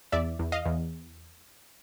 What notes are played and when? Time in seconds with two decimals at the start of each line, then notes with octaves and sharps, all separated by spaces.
0.12 E2 D5 E5
0.39 E2
0.52 D#5 F5
0.65 E2